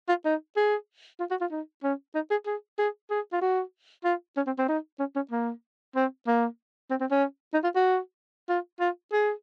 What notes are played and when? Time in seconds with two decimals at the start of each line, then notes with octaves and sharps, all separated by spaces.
0.08 F4
0.25 D#4
0.56 G#4
1.20 F4
1.30 F#4
1.41 F4
1.51 D#4
1.83 C#4
2.15 D#4
2.31 G#4
2.46 G#4
2.78 G#4
3.10 G#4
3.32 F4
3.41 F#4
4.04 F4
4.36 C#4
4.47 C4
4.58 C4
4.68 D#4
4.99 C#4
5.16 C#4
5.31 A#3
5.95 C4
6.27 A#3
6.90 C4
7.00 C4
7.11 C#4
7.53 D#4
7.64 F4
7.75 F#4
8.49 F4
8.80 F4
9.12 G#4